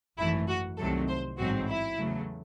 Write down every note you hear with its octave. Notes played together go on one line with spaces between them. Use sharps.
G#1 F#2 E3 A3 E4
F#4
C2 C3 D#3 F#3 A3 A4
C5
A1 G#2 F#3 C4 F#4
E4
E2 C#3 F#3 A3